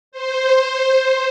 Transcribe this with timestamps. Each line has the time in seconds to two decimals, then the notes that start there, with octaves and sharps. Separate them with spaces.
0.12 C5